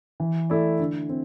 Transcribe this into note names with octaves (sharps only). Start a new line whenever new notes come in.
E3
A3 E4 A4 D5
D3
C4